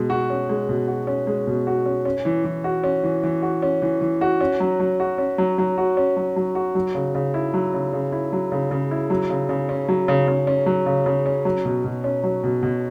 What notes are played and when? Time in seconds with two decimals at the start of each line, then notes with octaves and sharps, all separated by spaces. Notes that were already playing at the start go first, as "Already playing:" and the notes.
Already playing: B2 G#3
0.10 F#4
0.30 C#4
0.49 G#3
0.69 B2
0.88 F#4
1.07 C#4
1.27 G#3
1.47 B2
1.67 F#4
1.86 C#4
2.05 C#4
2.25 E3
2.45 E3
2.64 F#4
2.83 C#4
3.03 E3
3.23 E3
3.42 F#4
3.62 C#4
3.82 E3
4.01 E3
4.21 F#4
4.41 C#4
4.60 F#3
4.80 F#3
5.00 F#4
5.18 C#4
5.38 F#3
5.58 F#3
5.78 F#4
5.97 C#4
6.16 F#3
6.36 F#3
6.55 F#4
6.75 F#3
6.95 C#3
7.15 C#3
7.34 E4
7.54 F#3
7.73 C#3
7.93 C#3
8.12 E4
8.32 F#3
8.52 C#3
8.71 C#3
8.91 E4
9.10 F#3
9.30 C#3
9.49 C#3
9.69 C#4
9.88 F#3
10.08 C#3
10.28 C#3
10.47 C#4
10.66 F#3
10.86 C#3
11.06 C#3
11.26 C#4
11.45 F#3
11.65 B2
11.84 B2
12.04 C#4
12.23 F#3
12.44 B2
12.63 B2